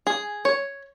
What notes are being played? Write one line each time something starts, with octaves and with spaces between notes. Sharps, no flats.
G#4
C#5